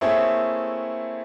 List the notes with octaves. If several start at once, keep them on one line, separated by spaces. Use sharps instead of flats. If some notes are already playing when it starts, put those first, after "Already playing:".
A3 A#3 C4 E4 G#4 C#5